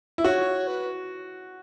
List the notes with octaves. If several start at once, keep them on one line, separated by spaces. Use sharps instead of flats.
E4
F#4 C#5
B4